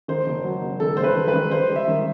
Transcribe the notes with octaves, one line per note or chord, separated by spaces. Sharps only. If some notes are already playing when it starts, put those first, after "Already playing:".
D#3 C5
F#1
F#3
F#1
D#3 A4
F#1 C5
B4
D#3
B4
D#3
G3 C5
G3
E5
D#3